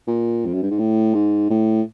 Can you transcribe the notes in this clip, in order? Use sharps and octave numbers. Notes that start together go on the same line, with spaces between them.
A#2
F2
F#2
G2
G#2
A2
G#2
A2